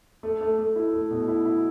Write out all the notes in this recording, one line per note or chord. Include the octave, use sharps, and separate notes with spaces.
A3
A3
A3
E4
A3
B2
E4
E4